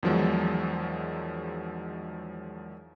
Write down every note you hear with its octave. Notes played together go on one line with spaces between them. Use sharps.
E2 D#3 F3 F#3 G#3